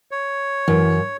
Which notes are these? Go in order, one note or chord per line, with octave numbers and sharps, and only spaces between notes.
C#5
F#2 E3